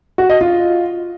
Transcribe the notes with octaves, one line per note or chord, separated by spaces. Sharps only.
F#4
D#5
F4